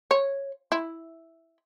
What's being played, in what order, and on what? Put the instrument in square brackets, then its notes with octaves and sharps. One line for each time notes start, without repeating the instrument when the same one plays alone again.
[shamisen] C#5
E4